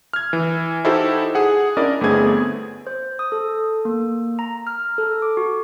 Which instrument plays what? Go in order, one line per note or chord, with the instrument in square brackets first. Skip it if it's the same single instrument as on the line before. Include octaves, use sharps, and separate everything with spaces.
[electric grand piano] F6 G#6
E3
D#4 E4 F#4 G4 A4 C5
G#4 F#5
C#4 D4 E4 A#4 D5 D#5
G1 A3 B3 C4 G#4 G#6
[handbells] C5
D#6
A4
A#3
A#5
F6
A4
D6
F#4